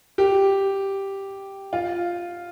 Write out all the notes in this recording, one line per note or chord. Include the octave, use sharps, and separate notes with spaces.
G4
F4